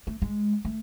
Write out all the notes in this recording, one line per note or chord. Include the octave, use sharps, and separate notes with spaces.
A3
G#3
A3